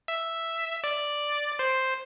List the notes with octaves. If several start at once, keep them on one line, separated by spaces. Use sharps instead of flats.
E5
D5
C5